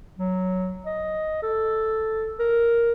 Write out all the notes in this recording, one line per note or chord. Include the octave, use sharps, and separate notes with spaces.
F#3
D#5
A4
A#4